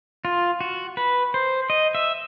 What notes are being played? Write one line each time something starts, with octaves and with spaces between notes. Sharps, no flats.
F4
F#4
B4
C5
D#5
E5